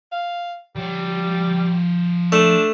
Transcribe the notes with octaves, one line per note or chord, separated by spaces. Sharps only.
F5
F3 G3 C#5
A3 D4